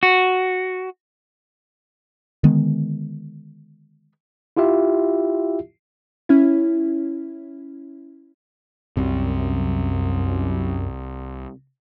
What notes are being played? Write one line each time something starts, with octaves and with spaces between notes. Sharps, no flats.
F#4
D3 D#3 G#3 B3
E4 F4 G4 E5
C#4 E4
C2 F#2 C3